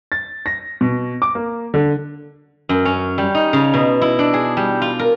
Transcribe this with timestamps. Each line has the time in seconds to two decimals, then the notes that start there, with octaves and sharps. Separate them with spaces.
0.12 A6
0.46 A#6
0.81 B2
1.22 D6
1.35 A#3
1.74 D3
2.69 F#2
2.85 C#4
3.18 G3
3.35 D#4
3.53 C#3
3.74 B2
4.01 E4
4.19 D4
4.33 G#4
4.57 G3
4.82 F4
4.99 A#4